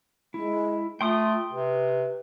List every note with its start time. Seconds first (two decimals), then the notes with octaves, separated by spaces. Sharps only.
0.34 G#3 E4
1.01 A3 F4 G5 C6 D#6
1.52 C3 B4